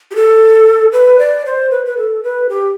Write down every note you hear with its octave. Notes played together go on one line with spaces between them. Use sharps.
G4
A4
B4
D5
C5
B4
B4
A4
B4
G4